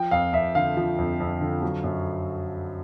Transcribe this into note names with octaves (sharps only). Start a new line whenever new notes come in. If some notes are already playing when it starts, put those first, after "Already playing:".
Already playing: F3 G5
F2 F5
F2 E5
D3 F5
F3
F2
F2
D3
F#3
F#2